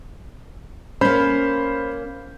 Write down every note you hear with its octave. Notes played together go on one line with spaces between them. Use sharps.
A#3 C#4 C5 B5 G6